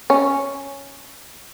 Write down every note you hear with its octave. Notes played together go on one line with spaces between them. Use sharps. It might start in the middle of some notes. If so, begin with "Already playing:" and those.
C#4